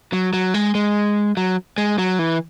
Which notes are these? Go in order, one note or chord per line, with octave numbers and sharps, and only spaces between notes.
F#3
F#3
G#3
G#3
F#3
G#3
F#3
E3